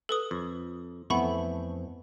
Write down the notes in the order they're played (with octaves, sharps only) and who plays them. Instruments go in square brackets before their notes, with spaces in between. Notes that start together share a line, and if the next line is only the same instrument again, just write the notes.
[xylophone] A4 B4 D#6
[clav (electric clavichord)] F2
[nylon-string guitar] F2 B3 C4 [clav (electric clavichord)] E3 A3 [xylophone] F#5 B5 C#6